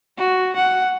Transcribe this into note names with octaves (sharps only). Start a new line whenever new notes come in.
F#4
F#5